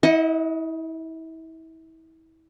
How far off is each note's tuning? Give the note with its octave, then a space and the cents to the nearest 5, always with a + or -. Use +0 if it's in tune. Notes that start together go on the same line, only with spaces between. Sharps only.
E4 -30 D#5 +20 F#5 -5